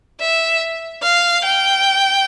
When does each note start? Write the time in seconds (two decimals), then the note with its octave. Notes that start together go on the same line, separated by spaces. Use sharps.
0.20 E5
1.03 F5
1.44 G5